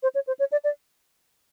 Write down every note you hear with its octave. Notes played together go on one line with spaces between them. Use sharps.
C5
C#5
C5
C#5
D5
D5